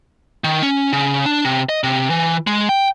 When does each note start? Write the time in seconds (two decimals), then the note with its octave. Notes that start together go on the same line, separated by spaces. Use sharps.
0.44 D#3
0.63 C#4
0.93 C#3
1.25 D4
1.44 C3
1.69 D#5
1.84 C3
2.10 E3
2.47 G#3
2.69 G5